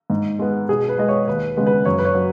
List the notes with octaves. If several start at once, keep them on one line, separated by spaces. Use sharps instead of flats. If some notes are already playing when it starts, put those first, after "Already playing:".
G#2
G#3 B3
B2 G#4
B4
G#3 B3 D#5
C#5
D#2 B4
C#3 G#3 B3
B4
F#2 C#5
B4
C#5
F#3